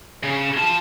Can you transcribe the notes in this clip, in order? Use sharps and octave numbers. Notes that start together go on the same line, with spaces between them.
C#3 C#4
F4 A5